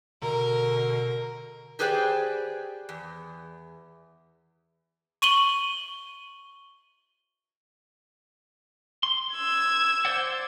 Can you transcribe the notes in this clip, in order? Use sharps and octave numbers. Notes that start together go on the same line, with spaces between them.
B2 D3 A#4
G4 G#4 B4 C5 D5 G5
E2
C#6 D#7 F#7 G7
C6
E6 G#6
C5 D5 F#5